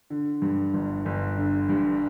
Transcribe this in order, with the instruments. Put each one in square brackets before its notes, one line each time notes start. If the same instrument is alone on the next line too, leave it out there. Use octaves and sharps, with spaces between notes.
[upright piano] D3
G2
G1
G1
D3
G2